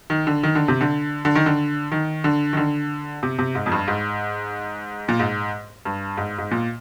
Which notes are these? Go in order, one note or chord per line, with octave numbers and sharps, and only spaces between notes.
D#3
D3
D#3
D3
C3
D3
D3
D#3
D3
D#3
D3
D#3
D3
C3
C3
G#2
F2
G2
G#2
A#2
G#2
G2
G#2
G#2
A#2